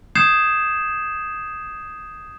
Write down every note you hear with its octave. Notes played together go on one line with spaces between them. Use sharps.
D#6 G6 G#6 C7 E7